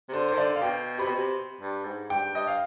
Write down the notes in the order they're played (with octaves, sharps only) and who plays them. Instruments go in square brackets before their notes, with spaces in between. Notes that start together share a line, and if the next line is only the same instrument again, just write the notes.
[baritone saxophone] C3
[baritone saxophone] D3 [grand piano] C5
[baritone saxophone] D#3 [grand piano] C5
[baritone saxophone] D3 [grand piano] D5
[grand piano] F5
[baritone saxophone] B2 [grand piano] G5
[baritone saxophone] C3 [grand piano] B5
[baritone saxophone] B2
C3
G2
G#2
[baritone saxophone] G2 [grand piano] G5
[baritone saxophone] G2 [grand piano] D#5
[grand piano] F5